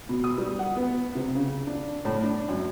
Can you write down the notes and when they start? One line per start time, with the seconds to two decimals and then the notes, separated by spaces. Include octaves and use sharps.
0.09 B2
0.24 D#6
0.38 G3
0.59 F#5
0.76 B3
1.15 C3
1.35 C#3
1.67 D4
2.05 A2
2.23 D4
2.49 F#2